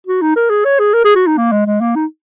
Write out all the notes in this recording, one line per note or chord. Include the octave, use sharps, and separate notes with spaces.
F#4
D#4
A#4
G#4
C#5
G#4
A#4
G#4
F#4
D#4
A#3
G#3
G#3
A#3
D#4